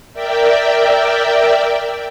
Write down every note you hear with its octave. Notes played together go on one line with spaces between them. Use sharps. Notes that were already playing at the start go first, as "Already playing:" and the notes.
A#4 D5 E5 G5